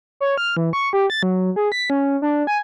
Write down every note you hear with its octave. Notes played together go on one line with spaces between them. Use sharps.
C#5
F6
E3
C#6
G4
A6
F#3
G#4
B6
C#4
D4
G#5